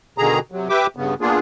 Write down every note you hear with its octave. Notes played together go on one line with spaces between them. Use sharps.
B2 D3 D#3 G#4 A#5
C3 F#3
G4 B4 E5 G5 D6
G2 C#3 B3
A#3 B3 D4 F4 G#4